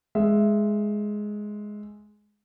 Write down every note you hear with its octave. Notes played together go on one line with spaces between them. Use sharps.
G#3 E5